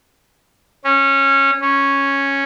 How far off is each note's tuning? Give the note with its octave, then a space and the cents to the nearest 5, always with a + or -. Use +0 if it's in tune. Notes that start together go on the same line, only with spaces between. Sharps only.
C#4 -15
C#4 -5